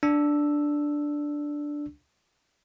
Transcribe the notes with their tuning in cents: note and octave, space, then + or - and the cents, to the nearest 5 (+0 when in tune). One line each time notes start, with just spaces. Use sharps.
D4 +0 E6 +0